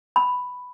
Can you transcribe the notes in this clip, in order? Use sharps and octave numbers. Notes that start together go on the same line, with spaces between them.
B5